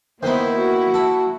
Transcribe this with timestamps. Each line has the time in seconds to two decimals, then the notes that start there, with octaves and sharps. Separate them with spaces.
0.23 D#3 A#3 B3 E4 C5
0.56 F#4
0.94 A4